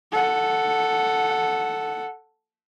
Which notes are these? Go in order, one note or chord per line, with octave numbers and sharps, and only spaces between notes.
A4 F#5